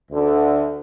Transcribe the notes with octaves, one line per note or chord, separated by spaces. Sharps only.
D2 D3